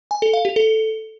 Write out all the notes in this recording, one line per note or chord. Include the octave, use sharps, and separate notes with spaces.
G#5
A4
F5
G4
A4